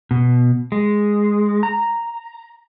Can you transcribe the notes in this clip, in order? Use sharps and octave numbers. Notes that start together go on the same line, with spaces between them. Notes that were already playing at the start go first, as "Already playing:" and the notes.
B2
G#3
A#5